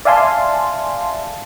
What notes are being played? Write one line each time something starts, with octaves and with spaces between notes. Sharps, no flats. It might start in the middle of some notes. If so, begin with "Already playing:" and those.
D5 E5 F5 G#5 A5 C6